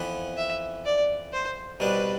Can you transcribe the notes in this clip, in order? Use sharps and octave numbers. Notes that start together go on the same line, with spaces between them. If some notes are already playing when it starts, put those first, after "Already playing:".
Already playing: F2 E3 B3 E4
E5
D5
C5
C2 B2 G3 D4 B4